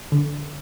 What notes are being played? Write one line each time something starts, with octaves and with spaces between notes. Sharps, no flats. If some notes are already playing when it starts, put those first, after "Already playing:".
D3